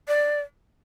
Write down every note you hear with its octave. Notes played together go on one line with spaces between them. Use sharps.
D5